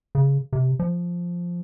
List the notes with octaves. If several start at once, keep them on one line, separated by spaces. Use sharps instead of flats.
C#3
C3
F3